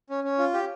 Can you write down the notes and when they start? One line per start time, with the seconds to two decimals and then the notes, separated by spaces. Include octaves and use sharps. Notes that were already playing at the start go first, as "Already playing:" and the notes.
0.10 C#4
0.24 C#4
0.39 F4
0.54 G4